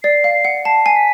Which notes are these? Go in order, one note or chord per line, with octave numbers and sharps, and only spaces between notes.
D5 C7
F5
C7
F#5
A5 C7
G#5
B6